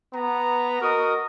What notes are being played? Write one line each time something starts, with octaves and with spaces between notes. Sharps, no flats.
B3 A#5
F#4 A#4 D#5 D#6